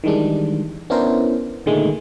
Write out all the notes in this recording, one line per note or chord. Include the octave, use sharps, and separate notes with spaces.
D#3 E3 G3 G#3 D4
B3 C#4 D4 E4 A#4 C5
A#2 D3 D#3 G#3 A3